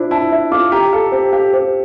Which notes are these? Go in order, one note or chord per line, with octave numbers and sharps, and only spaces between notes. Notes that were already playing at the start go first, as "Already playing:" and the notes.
Already playing: D4 E4 F4 C5
E4 A5
E5
F4 D6
G4 A#5
A4 F5
G4 C5
G4 F5
G4 C5